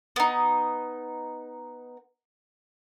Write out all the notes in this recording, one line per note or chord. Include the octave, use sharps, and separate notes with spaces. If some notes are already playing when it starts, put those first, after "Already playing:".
B3 D#4